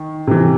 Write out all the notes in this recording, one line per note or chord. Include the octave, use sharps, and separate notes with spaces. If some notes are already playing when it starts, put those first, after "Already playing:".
Already playing: D#3
C3 E3